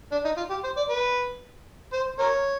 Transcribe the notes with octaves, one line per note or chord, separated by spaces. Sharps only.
D4
D#4
F4
G4
C5
D5
B4
C5
A#4 C#5